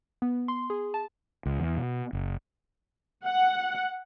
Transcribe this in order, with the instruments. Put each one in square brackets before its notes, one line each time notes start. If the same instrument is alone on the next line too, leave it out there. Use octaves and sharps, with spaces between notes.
[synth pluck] B3
C6
G#4
A5
[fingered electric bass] C#2
E2
B2
F#1
[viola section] F#5